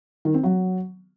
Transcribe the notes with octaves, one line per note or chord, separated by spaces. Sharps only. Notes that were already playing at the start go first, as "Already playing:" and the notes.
D#3
C4
F#3